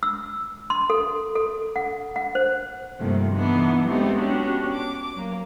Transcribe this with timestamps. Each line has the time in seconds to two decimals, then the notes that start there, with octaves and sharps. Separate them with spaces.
0.03 E6
0.70 C6
0.90 A4
1.35 A4
1.76 F#5
2.16 F#5
2.35 C5
3.00 G2 C3 D#3 F3 A3 A#3
3.34 E3 B3 D4 D#4
3.87 G#3 A3 B3 C4 D#4 G4
4.18 B3 C#4 D4 F#4 G4
4.73 D6
5.13 F#3 A#3